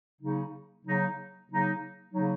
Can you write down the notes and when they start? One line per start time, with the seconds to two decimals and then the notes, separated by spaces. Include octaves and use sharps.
0.20 C#3 F#3 A#3 D#4
0.84 C#3 F#3 A#3 D#4
1.49 C#3 F#3 A#3 D#4
2.13 C#3 F#3 A#3 D#4